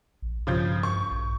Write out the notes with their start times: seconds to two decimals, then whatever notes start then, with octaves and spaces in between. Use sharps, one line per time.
0.22 A#1
0.47 G2 C#3 F3 G6
0.83 C#6
1.11 A#1